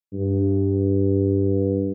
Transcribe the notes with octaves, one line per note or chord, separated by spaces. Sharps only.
G2